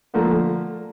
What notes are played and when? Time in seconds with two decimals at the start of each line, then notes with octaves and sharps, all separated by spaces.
0.14 D3 F3 A3 A#3